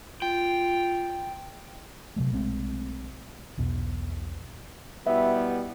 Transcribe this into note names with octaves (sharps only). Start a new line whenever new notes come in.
F4 G5
C3 F#3 A3
B1 G#3 A3 C4
B1 E2 B2
B2 G3 B3 E4 E5